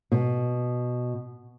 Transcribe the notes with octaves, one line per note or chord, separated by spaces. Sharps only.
B2